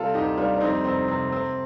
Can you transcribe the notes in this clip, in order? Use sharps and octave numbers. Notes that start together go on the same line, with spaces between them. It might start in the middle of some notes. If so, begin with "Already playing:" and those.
Already playing: C3 G3 F4 A4
D2 D#4 G4
G3 D4 F4
D4
F2 C4 D#4
F1 C4
C3 C4
C3 C4